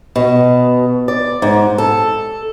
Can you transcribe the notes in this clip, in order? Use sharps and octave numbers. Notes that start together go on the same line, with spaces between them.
B2
D5
G#2
A4